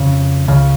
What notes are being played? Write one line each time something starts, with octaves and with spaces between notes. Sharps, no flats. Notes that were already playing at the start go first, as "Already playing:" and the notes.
Already playing: F2 C#3 C#4
C#2 C#3